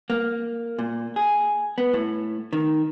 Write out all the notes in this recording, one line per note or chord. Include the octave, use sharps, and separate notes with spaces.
A#3
A#2
G#4
B3
A2
D#3